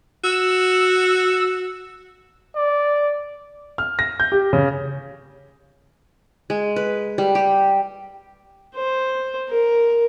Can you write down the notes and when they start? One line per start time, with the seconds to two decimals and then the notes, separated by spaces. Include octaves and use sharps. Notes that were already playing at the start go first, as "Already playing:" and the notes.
0.24 F#4 E6
2.56 D5
3.78 F6
3.99 A#6
4.20 G6
4.32 G4
4.53 C#3
6.50 G#3
6.76 B4
7.18 G3
7.35 G4
8.74 C5
9.49 A#4